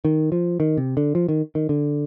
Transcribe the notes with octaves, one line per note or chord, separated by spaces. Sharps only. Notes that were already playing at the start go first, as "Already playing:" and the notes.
D#3
F3
D#3
C3
D3
F3
D#3
D#3
D3